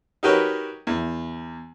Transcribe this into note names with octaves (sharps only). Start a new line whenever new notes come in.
D#4 F#4 G4 A#4 B4 C#5
E2